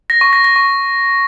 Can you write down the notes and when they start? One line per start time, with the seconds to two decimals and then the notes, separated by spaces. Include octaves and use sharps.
0.10 A#6
0.21 C#6
0.33 A#6
0.44 A#6
0.56 C#6